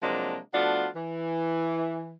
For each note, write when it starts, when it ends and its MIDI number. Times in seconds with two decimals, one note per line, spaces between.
0.03 0.37 48
0.03 0.37 53
0.03 0.37 54
0.03 0.37 56
0.03 0.37 58
0.03 0.37 62
0.54 0.87 53
0.54 0.87 57
0.54 0.87 59
0.54 0.87 62
0.54 0.87 65
0.54 0.87 66
0.95 2.15 52